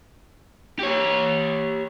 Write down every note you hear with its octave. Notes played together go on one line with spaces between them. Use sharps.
G4 C#5